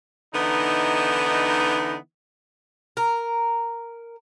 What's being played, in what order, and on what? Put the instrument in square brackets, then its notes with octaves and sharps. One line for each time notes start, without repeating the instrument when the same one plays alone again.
[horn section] D3 E3 B3 D#4
[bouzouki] A#4